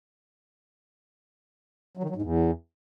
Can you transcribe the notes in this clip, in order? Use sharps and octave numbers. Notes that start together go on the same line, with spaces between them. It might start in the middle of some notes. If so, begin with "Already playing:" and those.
F#3
D#3
F#3
G#2
E2